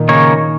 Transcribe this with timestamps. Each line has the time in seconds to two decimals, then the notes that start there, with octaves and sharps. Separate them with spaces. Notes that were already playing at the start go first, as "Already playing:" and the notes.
Already playing: A#2 D#3
0.09 C#3 A#3 D#4 C#5